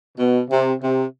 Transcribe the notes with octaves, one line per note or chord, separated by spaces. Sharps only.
B2
C3
C3